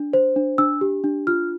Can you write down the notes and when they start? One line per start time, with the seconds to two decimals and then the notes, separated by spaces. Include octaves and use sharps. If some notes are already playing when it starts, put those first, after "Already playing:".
Already playing: D4
0.13 C5
0.36 D4
0.58 D4 E6
0.81 G4
1.04 D4
1.27 F4 F6